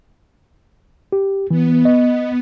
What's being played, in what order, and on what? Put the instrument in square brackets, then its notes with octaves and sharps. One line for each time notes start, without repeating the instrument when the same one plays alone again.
[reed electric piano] G4
[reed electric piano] E3 [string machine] B3
[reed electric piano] D#5